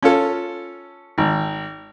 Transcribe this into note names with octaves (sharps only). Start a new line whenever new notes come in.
C#4 F4 A4
G#1